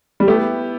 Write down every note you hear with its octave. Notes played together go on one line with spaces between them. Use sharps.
G3
A3 B3 E4 G4